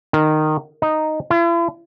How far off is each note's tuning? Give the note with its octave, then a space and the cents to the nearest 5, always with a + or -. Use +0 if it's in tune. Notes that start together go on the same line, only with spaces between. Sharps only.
D#3 -15
D#4 -5
E4 +45